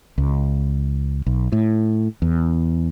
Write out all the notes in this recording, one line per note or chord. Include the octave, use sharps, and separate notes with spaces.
C#2
B1
A2
E2